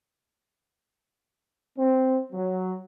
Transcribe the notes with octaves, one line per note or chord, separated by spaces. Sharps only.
C4
F#3